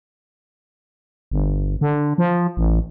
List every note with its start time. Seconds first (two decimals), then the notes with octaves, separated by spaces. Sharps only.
1.31 G1
1.81 D3
2.18 F3
2.57 A1